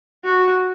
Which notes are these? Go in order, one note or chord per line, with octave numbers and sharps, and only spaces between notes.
F#4